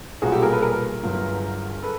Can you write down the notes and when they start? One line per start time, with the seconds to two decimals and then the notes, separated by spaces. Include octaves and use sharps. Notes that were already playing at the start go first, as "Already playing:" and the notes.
0.22 B1 A#2 G3 A#3 F#4 G#4
0.32 G4 A4
0.42 G#4 A#4
0.52 A4 B4
0.62 G#4 A#4
1.03 G1 G2 D3 F#3
1.82 A4 B4